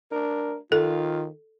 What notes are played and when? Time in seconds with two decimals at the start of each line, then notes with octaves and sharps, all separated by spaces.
0.12 D4 A#4
0.72 D#3 F4 A4